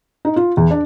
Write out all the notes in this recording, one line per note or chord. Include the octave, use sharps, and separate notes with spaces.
D#4
F4
E2
D4